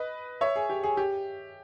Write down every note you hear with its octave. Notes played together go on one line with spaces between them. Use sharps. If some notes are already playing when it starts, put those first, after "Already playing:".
Already playing: B4 D#5
C#5 E5
G#4
G4
G#4
G4